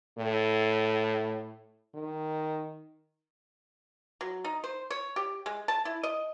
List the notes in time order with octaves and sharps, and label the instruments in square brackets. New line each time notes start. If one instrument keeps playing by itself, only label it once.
[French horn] A2
D#3
[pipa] F#3
D#4
C5
C#5
G4
G#3
A5
E4
D#5